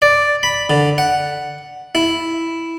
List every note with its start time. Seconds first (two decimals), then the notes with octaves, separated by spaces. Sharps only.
0.02 D5
0.43 B5
0.70 D3
0.98 F#5
1.95 E4